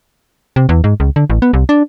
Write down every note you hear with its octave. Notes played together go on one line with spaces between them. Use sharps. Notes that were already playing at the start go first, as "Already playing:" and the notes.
C3
E2
G#2
C#2
D3
A1
B3
C2
D4